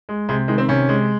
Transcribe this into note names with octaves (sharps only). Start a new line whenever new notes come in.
G#3
C3 G#3
D#3 G#3
C4
C3 C#4
G#3